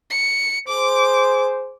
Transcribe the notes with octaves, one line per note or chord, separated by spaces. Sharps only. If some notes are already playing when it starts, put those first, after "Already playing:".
C#7
G#4 C5 D6